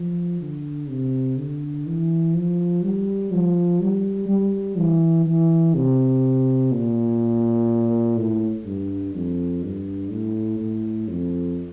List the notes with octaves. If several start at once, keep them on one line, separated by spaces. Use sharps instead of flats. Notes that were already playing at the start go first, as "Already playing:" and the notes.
Already playing: F3
D3
C3
D3
E3
F3
G3
F3
G3
G3
E3
E3
C3
A#2
A2
G2
F2
G2
A2
A2
F2